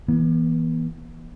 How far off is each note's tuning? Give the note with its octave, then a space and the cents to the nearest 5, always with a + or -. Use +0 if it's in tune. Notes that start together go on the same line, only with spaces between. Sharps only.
E3 -10 B3 -45